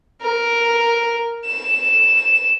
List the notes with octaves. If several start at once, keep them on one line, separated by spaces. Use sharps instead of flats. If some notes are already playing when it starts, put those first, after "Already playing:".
A#4
E7